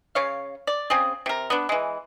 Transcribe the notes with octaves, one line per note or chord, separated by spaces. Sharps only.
C#3 C#5 F5
D5
C#3 C4 G#4
C3 A#4
B3 D4
E3 G#3